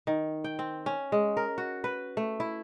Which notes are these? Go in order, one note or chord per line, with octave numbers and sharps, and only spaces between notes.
D#3
G5
C4
C#4
G#3
A#4
F#4
B4
A3
E4